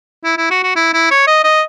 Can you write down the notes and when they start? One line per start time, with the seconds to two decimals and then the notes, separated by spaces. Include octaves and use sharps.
0.24 E4
0.37 E4
0.50 F#4
0.63 F#4
0.76 E4
0.94 E4
1.11 C#5
1.27 D#5
1.44 D#5